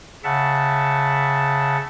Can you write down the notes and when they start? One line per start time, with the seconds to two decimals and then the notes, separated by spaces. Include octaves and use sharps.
0.24 C#3 E5 F#5 A5